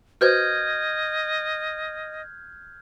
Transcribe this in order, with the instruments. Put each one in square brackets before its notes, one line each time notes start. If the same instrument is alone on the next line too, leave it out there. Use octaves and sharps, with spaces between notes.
[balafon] F#4 B4 C5 [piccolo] D#5 [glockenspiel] F6 G6 G#6